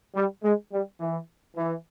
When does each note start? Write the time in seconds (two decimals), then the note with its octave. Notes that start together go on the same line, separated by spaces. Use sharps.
0.15 G3
0.43 G#3
0.72 G3
1.00 E3
1.56 E3